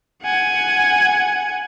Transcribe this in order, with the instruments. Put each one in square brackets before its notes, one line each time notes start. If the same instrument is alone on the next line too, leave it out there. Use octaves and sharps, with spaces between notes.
[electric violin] F#5 G#5